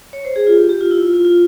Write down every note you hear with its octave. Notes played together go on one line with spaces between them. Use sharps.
C#5
C5
G#4
F4
G4
G4
F4
E4
F4
F4
F4